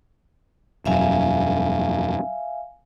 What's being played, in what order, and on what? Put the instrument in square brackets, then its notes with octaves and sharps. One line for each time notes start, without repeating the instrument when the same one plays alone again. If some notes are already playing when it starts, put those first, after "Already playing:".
[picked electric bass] E1 F#2 [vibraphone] E5 F5 G#5